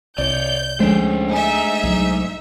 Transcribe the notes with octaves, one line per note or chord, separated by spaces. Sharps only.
C2 C#5 D5 G6
D2 F3 G#3 A3 C#4 D4 G#4 C5
G#2 D#4 E5 G#5
C2 F3 F#3